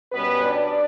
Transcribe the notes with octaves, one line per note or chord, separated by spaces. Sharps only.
B2 G3 B3 C#4 B4
D4 D5